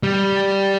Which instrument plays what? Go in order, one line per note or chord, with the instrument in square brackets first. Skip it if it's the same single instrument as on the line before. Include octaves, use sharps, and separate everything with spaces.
[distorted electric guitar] G3